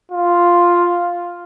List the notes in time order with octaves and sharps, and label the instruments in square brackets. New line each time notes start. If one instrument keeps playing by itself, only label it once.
[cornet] F4